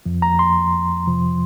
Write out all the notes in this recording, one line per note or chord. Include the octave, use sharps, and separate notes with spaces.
F2 F3
A#5
C6
F2 C3 F3